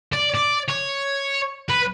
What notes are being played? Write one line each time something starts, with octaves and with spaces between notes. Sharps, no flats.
D5
D5
C#5
B4